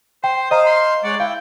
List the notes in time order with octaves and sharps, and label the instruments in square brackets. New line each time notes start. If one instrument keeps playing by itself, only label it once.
[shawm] C5 [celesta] G5
[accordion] C5 F5 [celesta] D#5 A#5 [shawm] D#6
[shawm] C6
[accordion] G#3 C#5 F#5 [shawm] D5
[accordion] E4 [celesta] F5 [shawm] G5